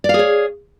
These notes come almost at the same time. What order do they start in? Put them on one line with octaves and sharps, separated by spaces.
D5 F5 G#4 C#5